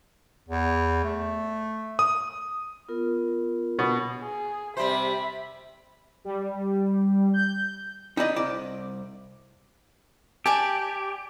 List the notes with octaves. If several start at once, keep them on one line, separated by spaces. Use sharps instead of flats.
E2
A3
D#6
B3 F4 A#4
B2
G#4
C3 G3 C5 E5 B5
G3
G6
D#4 E4 D5 D#5
C2 D5
G4 D5 G#5 A5